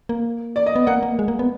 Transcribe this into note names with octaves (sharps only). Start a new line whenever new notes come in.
A#3
D5
D#5
B3
A#3 F#5
A#3
G#3
A#3
B3